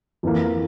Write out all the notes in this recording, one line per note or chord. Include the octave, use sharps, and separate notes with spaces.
F2 E3 A#3